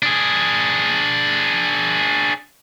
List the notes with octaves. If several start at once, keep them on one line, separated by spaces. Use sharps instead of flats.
D4 G#4